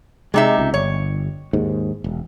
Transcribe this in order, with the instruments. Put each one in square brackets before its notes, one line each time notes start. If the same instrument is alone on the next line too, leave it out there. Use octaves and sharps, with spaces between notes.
[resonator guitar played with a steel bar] C3 D#4 E5 [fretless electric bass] G#3
[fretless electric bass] C#2
[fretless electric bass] G1 [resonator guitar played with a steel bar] C#5
[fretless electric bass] D#2 G#2
E1